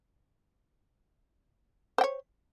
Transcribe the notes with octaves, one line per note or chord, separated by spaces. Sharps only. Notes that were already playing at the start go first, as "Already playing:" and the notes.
C5 C#5 G5